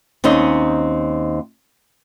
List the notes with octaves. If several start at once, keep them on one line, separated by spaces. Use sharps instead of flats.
D#2 C4 C#4 D#4 D#5